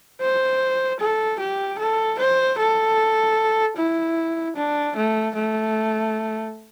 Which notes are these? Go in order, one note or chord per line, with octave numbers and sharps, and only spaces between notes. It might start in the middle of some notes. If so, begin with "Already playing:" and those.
C5
A4
G4
A4
C5
A4
E4
D4
A3
A3